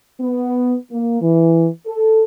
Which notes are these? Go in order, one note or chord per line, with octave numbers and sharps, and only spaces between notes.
B3
A#3
E3
A4